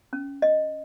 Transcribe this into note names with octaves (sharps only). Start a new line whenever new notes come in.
C#4
D#5